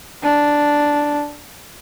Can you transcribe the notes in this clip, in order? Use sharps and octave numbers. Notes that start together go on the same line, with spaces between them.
D4